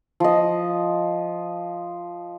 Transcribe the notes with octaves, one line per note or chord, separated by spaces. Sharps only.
F3 D#5